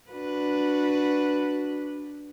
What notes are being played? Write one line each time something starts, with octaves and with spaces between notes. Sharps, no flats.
D4 F#4 B4